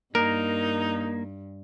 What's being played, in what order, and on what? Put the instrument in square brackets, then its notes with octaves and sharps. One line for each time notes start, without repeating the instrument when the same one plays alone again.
[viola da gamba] G2 [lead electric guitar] A#3 [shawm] D#4 [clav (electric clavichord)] A#4